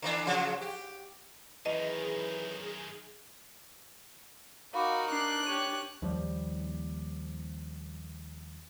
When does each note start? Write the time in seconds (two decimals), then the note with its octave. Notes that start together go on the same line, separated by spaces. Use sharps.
0.02 D3 E3 D4
0.26 C#3 F3 F#3
0.61 G4
1.66 F#2 D#3 E3 G#4 D#5
4.74 D#4 F#4 A#4 F5 B5 D6
5.11 D4 D6 F#6 C7
5.46 G4 C#5 D#7
6.02 D#2 F3 G3